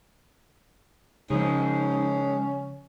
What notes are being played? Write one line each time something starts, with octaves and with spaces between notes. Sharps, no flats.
C#3 F3 G#3 C4 C#4 D#4